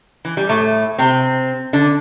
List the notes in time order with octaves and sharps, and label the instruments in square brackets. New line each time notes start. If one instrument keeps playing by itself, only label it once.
[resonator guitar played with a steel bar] E3
G3
A2 A3
C3 C4
D3 D4